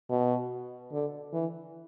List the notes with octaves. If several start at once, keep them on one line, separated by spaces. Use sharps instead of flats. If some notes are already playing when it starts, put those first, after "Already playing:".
B2
D3
E3